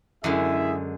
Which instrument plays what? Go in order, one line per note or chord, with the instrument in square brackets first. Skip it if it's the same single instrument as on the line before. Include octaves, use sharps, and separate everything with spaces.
[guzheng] F#2 D3 G#3 [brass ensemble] E4 G#4 E5